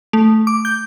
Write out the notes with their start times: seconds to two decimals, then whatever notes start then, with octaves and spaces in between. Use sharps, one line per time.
0.13 A3
0.47 D6
0.65 G6